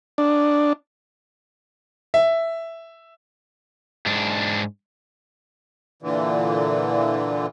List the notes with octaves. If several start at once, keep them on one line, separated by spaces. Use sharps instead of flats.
D4
E5
G#2 D4
A#2 D3 E3